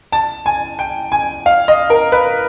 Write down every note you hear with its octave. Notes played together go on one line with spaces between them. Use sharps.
A5
G#5
G5
G#5
F5
D#5
A#4
B4